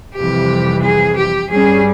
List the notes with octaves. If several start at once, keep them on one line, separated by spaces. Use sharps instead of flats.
F2 C3 E3 G3 G4
G#4
G4
G2 G3 C#4 G#4